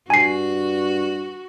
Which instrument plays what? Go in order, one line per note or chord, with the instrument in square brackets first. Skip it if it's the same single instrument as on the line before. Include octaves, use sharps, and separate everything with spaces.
[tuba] G2 [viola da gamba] F#4 [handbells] G#5 C7